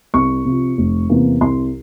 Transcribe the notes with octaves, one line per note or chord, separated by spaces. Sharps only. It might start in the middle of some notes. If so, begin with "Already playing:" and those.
C2 C#6
C3 F3
F1
E2 C3 E3 A#3
C2 C6